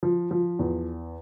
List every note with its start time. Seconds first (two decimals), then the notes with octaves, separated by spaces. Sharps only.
0.03 F3
0.31 F3
0.59 E2